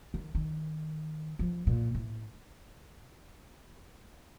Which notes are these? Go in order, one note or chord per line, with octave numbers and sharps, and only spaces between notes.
D#3
D#3
F3
A#2
A2